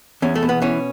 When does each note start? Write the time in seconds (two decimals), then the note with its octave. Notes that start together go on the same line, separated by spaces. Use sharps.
0.22 E2 C#4
0.35 A3
0.43 B2
0.49 B3
0.62 E3 C#4